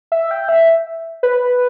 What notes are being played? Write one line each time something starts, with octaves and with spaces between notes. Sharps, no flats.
E5
G5
E5
B4